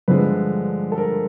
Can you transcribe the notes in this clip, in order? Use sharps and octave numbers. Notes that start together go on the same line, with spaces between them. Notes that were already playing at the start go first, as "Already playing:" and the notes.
G2 D3 F3 G#3 B4
A4
A#4